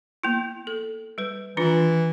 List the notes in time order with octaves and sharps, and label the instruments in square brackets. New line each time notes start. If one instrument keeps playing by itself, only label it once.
[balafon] A#3 B3 E4
A4
G3 B4
[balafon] D#3 D4 F4 [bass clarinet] E3